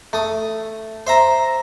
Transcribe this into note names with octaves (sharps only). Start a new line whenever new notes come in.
A3 D#6
C5 E5 A#5